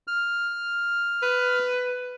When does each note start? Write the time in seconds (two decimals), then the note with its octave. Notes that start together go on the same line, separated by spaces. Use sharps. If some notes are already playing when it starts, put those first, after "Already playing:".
0.07 F6
1.23 B4